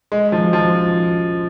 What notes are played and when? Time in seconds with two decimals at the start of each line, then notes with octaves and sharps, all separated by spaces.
0.12 G#3
0.32 F3
0.53 F3